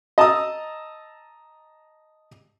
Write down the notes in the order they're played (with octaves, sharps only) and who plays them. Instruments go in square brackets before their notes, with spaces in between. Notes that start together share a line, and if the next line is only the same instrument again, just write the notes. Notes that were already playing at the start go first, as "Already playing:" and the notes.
[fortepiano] D#5 A5 A#5 D#6 E6